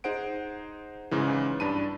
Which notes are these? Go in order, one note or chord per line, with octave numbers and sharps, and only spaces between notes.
D#4 G#4 C5 F#5 D7
G#2 C#3 E3
G2 D4 A5 B5 D#7